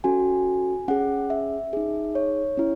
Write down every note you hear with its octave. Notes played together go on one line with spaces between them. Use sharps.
C#4 F#4 A4 G#5
C#4 G#4 F#5
E5
D#4 G#4
C#5
C#4 E4